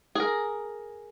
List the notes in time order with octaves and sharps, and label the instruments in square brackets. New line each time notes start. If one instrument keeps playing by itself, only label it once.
[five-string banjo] G#4 A#4